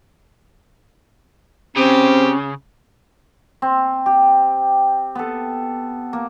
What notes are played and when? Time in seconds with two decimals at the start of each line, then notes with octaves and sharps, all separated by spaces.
1.77 C#3 C4 C#4 G4
3.62 C4
4.06 G4
5.15 B3 A4
6.13 A#3